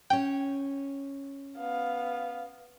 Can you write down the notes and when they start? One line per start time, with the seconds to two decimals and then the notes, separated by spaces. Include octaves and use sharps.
0.10 C#4 C#5 G5
1.58 B3 F5